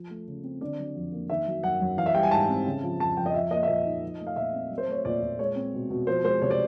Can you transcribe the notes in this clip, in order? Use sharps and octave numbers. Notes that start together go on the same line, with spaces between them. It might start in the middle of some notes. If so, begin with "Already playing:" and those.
Already playing: F3
A3
C#3
C4
D3 D5
F#3
F2
A#3
D#3 E5
F#3
F#2 F#5
F#2
E3 F5
E5
G3 G5
G#5
G#2 A5
C4
C#3
F3
F2 A5
F2 G5
D#5
F3 E5
A#3 D#5
E5
A#2 D#5
D#4
F3
A3
F5
A#2 E5
C4
F#3
C5
A3 C#5
A#2 D5
A#2
G#3 C#5
C4
B2
B2
F3 C5
G#3 C5
C3 C#5
D5